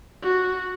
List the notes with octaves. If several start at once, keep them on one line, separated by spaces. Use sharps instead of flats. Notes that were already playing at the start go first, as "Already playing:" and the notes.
F#4